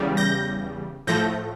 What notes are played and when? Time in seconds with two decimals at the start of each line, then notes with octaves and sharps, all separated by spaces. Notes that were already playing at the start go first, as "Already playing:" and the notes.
Already playing: E2 C#3 G3
0.17 G6 A#6
1.07 A2 F3 A3 G6 A#6